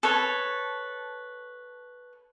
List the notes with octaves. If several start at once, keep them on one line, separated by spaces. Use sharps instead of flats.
A4 B4 C#5